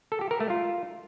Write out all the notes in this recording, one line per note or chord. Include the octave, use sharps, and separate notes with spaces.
A4
G4
A#4
A3
F4